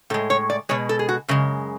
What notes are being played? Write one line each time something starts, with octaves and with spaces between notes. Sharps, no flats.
A2 G#3 A4
C#5
D5
B2 G#3 C#5
A4
G#4
F#4
F#2 C#3 G#3